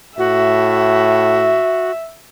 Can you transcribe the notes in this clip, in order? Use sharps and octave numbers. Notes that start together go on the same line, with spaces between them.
A2 F#4 E5